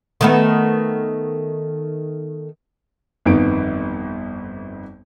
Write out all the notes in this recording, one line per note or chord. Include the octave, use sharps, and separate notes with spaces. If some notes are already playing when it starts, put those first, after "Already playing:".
D#3 A3 B3
G1 F2 D#3 B3 D#4 D7